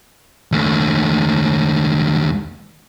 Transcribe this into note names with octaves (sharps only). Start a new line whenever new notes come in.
D#2 A3